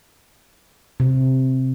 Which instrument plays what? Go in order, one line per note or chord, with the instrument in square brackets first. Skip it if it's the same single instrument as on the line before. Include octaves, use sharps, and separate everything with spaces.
[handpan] C3